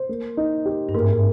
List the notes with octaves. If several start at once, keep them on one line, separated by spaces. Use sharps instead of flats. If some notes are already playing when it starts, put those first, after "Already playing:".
Already playing: C5
A#3
D#4
G4
G2
G#2 A#3